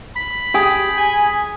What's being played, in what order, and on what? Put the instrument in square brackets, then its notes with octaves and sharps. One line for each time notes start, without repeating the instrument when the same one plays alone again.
[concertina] B5
[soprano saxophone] G4 [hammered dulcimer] G#4
[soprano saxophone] G#5